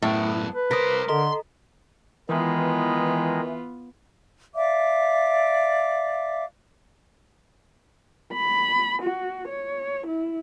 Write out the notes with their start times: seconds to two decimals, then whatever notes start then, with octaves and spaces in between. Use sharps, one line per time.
0.02 F#2 A2 B3
0.55 B4
0.71 C2 A#4 C5 D#6 A#6 B6
1.09 D3 A4 D#5 A#5 C6
2.29 D#3 E3 G#3 B3 F4
4.55 D5 E5 F5 D6
8.33 B5
9.02 F#4
9.48 C#5
10.07 E4